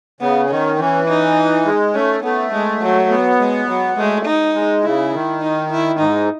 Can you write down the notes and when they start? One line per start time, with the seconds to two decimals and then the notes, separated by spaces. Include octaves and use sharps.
0.21 C#3 B3
0.50 D#3 C#4
0.79 E3 C#4
1.08 D#4
1.66 G#3
1.95 A3 C#4
2.24 A3 B3
2.52 G#3
2.81 F#3
3.10 B3
3.39 G#3
3.69 F#3
3.97 G#3 A3
4.26 D#4
4.55 G#3
4.84 C#3 E4
5.13 D#3
5.42 D#4
5.71 E4
5.99 G#2 D#4